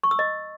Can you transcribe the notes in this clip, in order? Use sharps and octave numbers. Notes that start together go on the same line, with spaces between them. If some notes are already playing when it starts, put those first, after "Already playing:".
C#6
E6
D#5